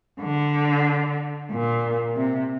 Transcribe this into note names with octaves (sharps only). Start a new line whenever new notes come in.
D3
A#2
C3